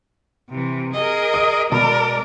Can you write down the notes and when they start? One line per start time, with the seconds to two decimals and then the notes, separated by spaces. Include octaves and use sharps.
0.50 C3 E3
0.94 G#4 A#4 D#5
1.34 D#6
1.72 B2 G#3 A#4 D5 A#5 B5